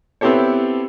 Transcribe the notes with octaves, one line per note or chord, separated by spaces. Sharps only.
B3 C4 E4 G4 A4 C#5